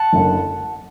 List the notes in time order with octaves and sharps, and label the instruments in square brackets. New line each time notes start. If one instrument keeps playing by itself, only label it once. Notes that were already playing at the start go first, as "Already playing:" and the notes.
Already playing: [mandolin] F#5 A5
[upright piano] F#1 F#2 D3